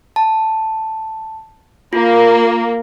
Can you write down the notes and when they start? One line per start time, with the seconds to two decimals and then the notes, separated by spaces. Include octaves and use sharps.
0.16 A5
1.93 A#3 F4